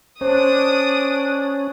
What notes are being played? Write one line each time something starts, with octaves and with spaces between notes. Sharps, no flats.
C#4 D4 C5 D#6